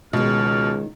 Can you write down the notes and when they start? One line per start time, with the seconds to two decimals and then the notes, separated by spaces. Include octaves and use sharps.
0.13 C#2 B2 D#3 G#3 F6